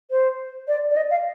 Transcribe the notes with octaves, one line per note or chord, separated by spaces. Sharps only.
C5
D5
D5
D#5
F5